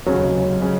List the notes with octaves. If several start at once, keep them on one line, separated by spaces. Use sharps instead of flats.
F1 D#2 C#3 F#3 G#3 C#4
C#3 G#3 C#4